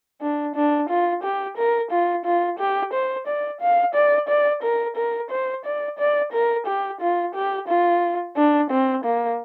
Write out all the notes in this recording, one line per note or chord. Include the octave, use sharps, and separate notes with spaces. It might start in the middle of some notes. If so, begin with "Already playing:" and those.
D4
D4
F4
G4
A#4
F4
F4
G4
C5
D5
F5
D5
D5
A#4
A#4
C5
D5
D5
A#4
G4
F4
G4
F4
D4
C4
A#3